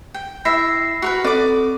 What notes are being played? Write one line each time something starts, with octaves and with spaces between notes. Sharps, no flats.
G5
E4 E5 A#6 C7
F#4 A#4 B4
C4 A4 D5 D6